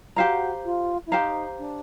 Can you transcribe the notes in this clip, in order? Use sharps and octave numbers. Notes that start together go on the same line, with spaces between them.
F#4 G4 C5 F5 A#5
F4
E4
D#4 G4 C5 F5 A#5
D4